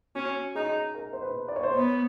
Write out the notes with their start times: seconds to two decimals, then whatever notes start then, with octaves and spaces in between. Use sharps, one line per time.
0.15 C#4 F#4
0.55 D#4 G#4
0.95 A#4
1.13 C5
1.22 B4
1.48 D5
1.56 C#5
1.63 C5
1.71 B3 C#5